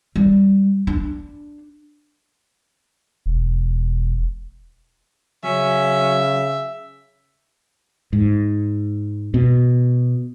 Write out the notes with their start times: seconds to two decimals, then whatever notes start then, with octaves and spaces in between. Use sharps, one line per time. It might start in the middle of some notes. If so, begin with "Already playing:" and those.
0.16 G3
0.87 D4
3.26 E1
5.44 C#3 F#3 C#4 E5
8.13 G#2
9.34 B2